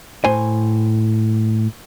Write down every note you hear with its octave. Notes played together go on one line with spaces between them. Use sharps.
A2 C5 G#5